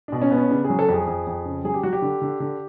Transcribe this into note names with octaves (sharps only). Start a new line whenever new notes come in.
B2 D4
C#4
B3
C#4
C#3 D4
G#4
F#3
A4
F2 G#4
F2
F2
C#3
F#3 G#4
G4
F#3 F#4
G4
D3
D3
D3